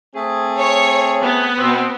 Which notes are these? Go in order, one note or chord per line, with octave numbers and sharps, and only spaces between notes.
A3 C4 G#4
C#5
B3
B2 C4